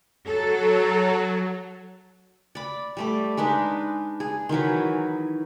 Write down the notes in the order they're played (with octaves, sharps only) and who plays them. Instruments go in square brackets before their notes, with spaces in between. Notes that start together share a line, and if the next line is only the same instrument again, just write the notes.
[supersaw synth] F#3 [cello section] A4
[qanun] D5 B5
G3 A3 D5
G#3 D4 D#4 B4
G#4
D#3 E3 F#3 B4